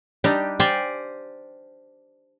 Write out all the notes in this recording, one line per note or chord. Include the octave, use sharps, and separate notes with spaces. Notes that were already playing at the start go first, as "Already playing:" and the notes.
G3 D4 D#4 G4
G4 C5 D5 F5 G5 G#5